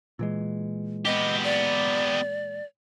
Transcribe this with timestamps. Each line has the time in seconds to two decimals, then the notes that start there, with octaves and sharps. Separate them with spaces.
0.19 A#2 E3 G#3
1.05 B3 G4 D#5
1.44 D5